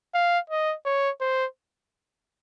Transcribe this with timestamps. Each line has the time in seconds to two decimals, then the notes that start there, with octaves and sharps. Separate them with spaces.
0.14 F5
0.50 D#5
0.85 C#5
1.21 C5